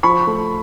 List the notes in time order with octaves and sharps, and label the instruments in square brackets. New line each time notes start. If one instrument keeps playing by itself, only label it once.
[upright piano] F3 B5 C#6
A3